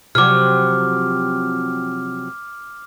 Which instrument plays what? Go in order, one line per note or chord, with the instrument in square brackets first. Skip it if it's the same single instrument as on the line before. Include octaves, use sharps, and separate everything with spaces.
[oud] C3 F3 F#3 [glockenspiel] D6 F6